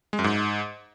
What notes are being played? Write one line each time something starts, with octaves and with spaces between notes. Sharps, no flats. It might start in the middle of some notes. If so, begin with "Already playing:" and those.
G#3
F#2
G#2